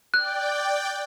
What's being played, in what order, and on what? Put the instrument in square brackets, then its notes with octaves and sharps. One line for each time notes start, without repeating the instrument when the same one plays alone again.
[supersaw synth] D5 G5 [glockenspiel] F#6